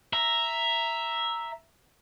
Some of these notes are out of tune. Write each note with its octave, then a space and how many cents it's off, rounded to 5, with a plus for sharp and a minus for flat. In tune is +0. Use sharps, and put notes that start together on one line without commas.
E5 +0 A#5 +0